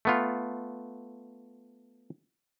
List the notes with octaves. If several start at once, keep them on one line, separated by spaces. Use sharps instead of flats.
A3 B3 F4